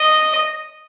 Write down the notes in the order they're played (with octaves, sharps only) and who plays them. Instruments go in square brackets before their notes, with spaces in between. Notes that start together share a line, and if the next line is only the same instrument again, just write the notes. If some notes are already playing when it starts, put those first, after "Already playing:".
Already playing: [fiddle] D#5